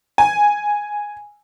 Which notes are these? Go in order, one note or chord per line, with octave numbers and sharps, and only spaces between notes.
G#5